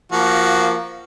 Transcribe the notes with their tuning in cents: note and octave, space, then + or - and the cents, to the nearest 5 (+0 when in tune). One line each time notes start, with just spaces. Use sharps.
F3 -15 A#3 +0 F#4 +0